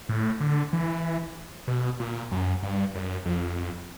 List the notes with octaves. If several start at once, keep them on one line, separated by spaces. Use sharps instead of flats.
A2
D3
E3
B2
A#2
F#2
G2
F#2
F2